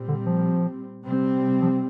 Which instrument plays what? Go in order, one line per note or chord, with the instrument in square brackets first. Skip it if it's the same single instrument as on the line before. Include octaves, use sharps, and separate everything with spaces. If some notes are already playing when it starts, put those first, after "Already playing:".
Already playing: [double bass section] A#2 G3 C4
[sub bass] D3
F3
[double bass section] C3 G3 C4
[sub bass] F3